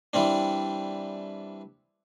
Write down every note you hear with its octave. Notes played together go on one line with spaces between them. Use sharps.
E3 G3 C4 D4